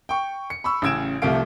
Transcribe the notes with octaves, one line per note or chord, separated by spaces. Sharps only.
G5 C#6
C#7
B5 C#6 E6
A1 C#3 E6 G#6 D7 E7
C2 C3 F3 A3 F5 D7